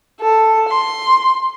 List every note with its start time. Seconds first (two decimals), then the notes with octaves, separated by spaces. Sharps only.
0.21 A4
0.69 C6